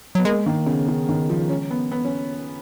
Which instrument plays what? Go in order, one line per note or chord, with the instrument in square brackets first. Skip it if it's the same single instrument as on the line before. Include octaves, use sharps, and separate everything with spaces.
[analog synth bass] F#3 [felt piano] B3
[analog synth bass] G#3 [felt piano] A#3
[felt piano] D#3 [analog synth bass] A#3
[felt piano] C#3 [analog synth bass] B3
[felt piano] C#3
D#3
F3
[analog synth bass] G#3 [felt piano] C#4
[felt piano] B3
B3
[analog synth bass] F3 [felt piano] C#4